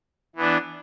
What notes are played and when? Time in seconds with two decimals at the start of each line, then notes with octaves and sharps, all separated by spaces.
0.36 E3 B3 D4